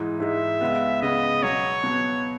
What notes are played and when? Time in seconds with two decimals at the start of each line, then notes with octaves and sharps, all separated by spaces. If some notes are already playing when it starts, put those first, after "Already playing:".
Already playing: G#2 E3 G#3 D#4
0.20 G#2 E3 G#3 D#4 E5
0.61 C#2 C#3 G#3 B3
1.02 C#2 C#3 G#3 B3 D#5
1.43 B2 F#3 B3 C#5
1.84 B2 F#3 B3